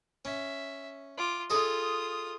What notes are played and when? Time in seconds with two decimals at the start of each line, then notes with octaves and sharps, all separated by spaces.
0.25 C#4 E5
1.17 F4 D6
1.50 F4 G#4 A4 D#5 D#6